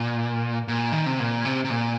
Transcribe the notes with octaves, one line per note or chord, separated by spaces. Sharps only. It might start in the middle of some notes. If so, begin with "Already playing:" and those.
Already playing: A#2
A#2
D#3
C3
A#2
C3
C3
A#2